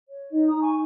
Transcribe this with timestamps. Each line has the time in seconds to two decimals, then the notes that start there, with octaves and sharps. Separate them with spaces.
0.09 C#5
0.31 D#4 D#5
0.47 A#5 D#6
0.54 D#4
0.61 G#5 C#6